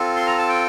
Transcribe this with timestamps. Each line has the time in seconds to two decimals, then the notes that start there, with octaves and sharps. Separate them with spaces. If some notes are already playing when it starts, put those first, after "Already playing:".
Already playing: C4 F4 A4
0.16 C6
0.27 A#5
0.38 A5
0.48 G5